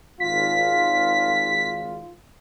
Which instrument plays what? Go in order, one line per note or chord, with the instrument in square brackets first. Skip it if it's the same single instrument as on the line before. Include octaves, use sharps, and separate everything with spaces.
[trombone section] G#1 F4 [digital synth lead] B6